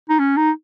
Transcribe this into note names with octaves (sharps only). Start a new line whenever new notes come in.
D#4
C#4
D#4